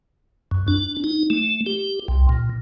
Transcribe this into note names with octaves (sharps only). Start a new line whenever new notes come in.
F#2
D4
D#4
A3
G4
C2
A#2